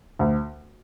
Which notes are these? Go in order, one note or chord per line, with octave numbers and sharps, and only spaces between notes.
D2